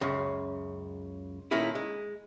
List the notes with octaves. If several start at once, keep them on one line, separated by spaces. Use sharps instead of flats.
C#2 F#2 C#3
A#2 D#3 A3 A#3 C#4 E4
G#3